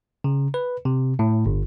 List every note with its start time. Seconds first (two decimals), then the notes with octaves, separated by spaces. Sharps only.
0.24 C#3
0.54 B4
0.85 C3
1.19 A2
1.46 G1